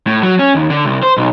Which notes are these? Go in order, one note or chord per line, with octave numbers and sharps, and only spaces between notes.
A2
F#3
C#4
D#2
D3
C2
C5
B1